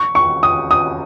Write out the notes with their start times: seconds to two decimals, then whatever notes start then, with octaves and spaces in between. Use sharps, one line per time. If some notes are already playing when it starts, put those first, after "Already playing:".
Already playing: C#6
0.15 C#6
0.43 D#6
0.71 D#6